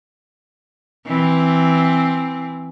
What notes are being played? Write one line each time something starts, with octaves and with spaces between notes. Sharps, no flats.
E3 C4